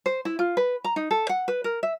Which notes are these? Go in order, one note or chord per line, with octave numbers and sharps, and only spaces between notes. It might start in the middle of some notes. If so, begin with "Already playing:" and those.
C5
E4
F4
B4
A#5
D#4
A4
F#5
B4
A#4
E5